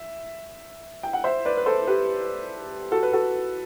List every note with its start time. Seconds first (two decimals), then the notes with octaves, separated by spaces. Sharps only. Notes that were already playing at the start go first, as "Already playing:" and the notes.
Already playing: E5
1.03 G5
1.13 F#5
1.24 C5 E5
1.45 B4 D5
1.57 B4
1.66 A4 C5
1.87 G4 B4
2.92 F#4 A4
3.03 B4
3.13 F#4 A4